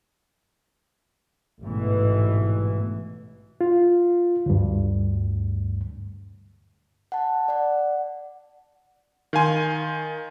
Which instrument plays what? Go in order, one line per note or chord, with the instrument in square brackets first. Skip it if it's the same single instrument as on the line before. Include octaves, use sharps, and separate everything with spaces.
[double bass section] A1 G#2 B2 E3
[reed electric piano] F4
D2 G2
[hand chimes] F#5 A5
D5 F#5
[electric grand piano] D#3 F5 G#5 C6